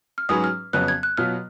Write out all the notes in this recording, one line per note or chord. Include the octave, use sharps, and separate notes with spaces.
F6
G#2 F#3 C#4 G#4 B4 D#6
F6
F2 C#3 F#3 B3 F#6
G#6
F#6
B2 F#3 B3 F4 F6